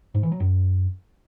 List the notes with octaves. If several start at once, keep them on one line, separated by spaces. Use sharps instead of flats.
G#2
E3
F#3
F#2